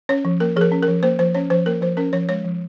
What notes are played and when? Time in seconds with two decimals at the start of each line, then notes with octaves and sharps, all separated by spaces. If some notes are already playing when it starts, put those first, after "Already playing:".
0.09 C#4 C#5
0.25 F3
0.40 A#3 A#4
0.56 F3 G#4
0.61 A#4
0.72 C#4
0.83 A#4
0.88 F3
1.03 A#3 C5
1.19 F3 C5
1.34 C#4 C#5
1.50 F3 C5
1.66 A#3 A#4
1.81 F3 C5
1.97 C#4 A#4
2.13 F3 C#5
2.29 G#3 C#5
2.45 F3